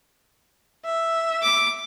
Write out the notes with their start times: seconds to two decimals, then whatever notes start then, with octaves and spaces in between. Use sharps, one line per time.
0.85 E5
1.42 D6